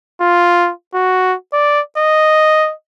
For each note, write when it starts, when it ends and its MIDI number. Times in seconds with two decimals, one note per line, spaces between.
0.21 0.71 65
0.94 1.34 66
1.53 1.80 74
1.97 2.73 75